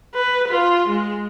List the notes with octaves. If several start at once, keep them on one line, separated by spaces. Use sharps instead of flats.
B4
F4
G#3